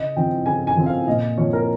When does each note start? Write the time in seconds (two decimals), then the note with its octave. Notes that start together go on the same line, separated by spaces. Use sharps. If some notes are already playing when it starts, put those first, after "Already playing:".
Already playing: C#3 D#5
0.16 F3 C4 G5
0.46 C#3 G#5
0.67 G#5
0.76 F3 C4
0.86 F5
1.07 A#2 D#5
1.37 F3 C4 C#5
1.53 A#4